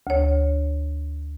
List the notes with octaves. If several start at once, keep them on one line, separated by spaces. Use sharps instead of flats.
D2 C#5